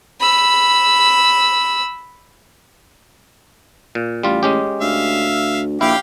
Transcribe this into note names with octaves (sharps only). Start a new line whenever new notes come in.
B5 E6
A#2
A1 G3 F4
G#3 C#4 G4
D2 E5 F5
A#1 E4 G4 F5 G5